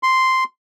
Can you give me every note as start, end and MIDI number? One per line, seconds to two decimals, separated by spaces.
0.03 0.44 84